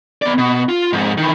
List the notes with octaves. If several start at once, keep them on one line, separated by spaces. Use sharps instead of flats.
B3 D5
B2
F4
F2 G#2
D#3 E3